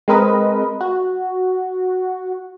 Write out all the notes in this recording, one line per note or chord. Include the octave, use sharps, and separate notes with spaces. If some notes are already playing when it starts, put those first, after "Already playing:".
G#3 C4 A#4 B4 D#5
F#4